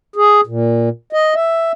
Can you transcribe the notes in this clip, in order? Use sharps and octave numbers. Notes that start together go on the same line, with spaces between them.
G#4
A#2
D#5
E5